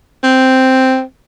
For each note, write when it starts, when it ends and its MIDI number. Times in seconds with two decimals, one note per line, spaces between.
0.24 1.02 60